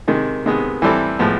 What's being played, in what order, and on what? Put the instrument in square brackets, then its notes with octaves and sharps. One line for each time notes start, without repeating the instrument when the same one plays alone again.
[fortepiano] C3 D#3 G#3
C3 D#3 G#3 B3
E3 G3 C4 E4 A4
A2 F3 G#3 B3